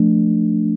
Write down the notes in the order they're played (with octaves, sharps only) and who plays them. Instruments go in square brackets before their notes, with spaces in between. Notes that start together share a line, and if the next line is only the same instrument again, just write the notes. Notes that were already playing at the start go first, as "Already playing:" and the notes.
Already playing: [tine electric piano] F3 A3 D4